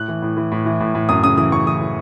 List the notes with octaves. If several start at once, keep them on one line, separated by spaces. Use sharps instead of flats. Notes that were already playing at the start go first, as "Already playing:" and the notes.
Already playing: A2 F#6
E3
A2
E3
A2
E3
A2
A2
F#2 D#6
C#3 D#6
E3 D#6
F#2 C#6
E3 D#6
E3